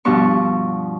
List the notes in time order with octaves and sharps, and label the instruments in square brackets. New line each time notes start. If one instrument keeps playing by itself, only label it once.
[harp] G2 B2 F3 B3 D4 C#6